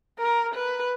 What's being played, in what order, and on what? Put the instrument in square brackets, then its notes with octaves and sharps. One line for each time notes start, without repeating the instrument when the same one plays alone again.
[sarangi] A#4
B4